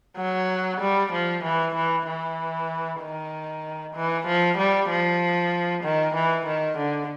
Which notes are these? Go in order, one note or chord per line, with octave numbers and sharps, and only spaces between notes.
F#3
G3
F3
E3
E3
E3
D#3
E3
F3
G3
F3
D#3
E3
D#3
D3